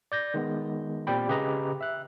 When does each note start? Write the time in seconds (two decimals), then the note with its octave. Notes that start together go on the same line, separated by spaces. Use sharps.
0.12 D5 G6 A#6
0.34 D#3 G#3 B3
1.07 A#2 C4 G4 D5 G5 B5
1.28 C#3 G4 G#4 B4 D#5 A#5
1.81 E5 F#6